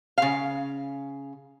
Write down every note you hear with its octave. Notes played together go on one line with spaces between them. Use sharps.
C#3 F5